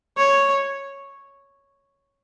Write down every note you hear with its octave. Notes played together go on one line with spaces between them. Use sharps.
C#5